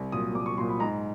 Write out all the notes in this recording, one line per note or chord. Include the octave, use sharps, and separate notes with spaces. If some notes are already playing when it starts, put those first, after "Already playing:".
Already playing: C2
A#2 F#3 D#6
C2 D6
C#6
A#2 F#3 C6
B5
G#2 A#5